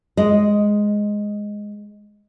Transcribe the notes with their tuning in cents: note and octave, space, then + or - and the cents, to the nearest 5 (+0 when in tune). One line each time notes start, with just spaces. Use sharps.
G#3 +0 D#5 +0